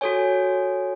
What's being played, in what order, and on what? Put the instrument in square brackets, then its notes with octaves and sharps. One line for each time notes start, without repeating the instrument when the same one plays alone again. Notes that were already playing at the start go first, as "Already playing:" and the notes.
[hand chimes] F#4 A4 C#5 G#5